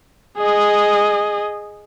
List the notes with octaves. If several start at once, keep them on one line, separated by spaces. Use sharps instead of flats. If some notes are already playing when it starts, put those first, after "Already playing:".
G#4 D#5